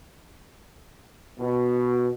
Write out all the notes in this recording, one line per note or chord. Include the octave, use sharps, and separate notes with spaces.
B2